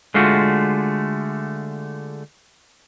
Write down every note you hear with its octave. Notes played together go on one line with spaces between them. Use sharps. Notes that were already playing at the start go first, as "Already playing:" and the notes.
D3 G#3 A3 F4 F#4